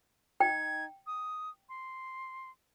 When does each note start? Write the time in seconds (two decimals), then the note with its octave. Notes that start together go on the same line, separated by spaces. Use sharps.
0.40 D#4 G5 G#6
1.06 D#6
1.69 C6